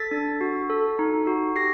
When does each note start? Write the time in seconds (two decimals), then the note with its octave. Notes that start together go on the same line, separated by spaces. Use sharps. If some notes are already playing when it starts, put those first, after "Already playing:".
Already playing: A4 A6 B6
0.11 D4
0.41 F#4
0.70 A4
0.99 D#4
1.27 F#4
1.56 G4 A#6 C7